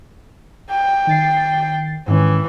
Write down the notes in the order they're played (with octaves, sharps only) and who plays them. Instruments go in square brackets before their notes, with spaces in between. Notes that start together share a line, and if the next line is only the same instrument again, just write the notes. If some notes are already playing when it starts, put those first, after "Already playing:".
[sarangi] G5
[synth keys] D#3 A6 C7
[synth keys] G#2 D#3 C#4 [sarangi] E3